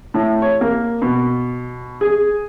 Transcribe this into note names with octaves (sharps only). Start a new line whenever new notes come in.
A2
C#5
A#3
B2
G#4